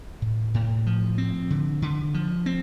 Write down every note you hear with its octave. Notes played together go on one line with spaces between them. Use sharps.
A2
A2
F3
C4
D3
D3
F3
C4